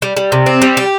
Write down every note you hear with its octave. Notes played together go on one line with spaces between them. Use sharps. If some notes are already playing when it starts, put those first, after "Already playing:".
G3
G3
C3
C4
G3
G4